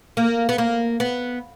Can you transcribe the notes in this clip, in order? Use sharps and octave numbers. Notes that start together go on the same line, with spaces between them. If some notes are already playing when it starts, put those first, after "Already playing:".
A#3
B3
A#3
B3